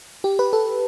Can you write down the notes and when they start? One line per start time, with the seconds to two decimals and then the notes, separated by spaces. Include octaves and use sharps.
0.24 G4
0.39 B4
0.53 A4